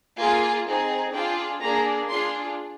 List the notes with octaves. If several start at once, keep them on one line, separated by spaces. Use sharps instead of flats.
A#3 F4 G#4 G#5
C4 D#4 G#4
D4 F4 G#4 G5
A#3 D4 G#4 A#5
D4 F4 G#4 C6